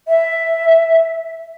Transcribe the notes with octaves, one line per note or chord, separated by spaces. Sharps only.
E5